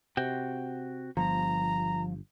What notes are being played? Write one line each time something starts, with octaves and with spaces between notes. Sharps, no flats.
C3 F#4 G5
G1 F3 A#5